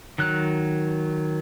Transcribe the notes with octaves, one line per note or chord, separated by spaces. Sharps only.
D#3 F#3 F#6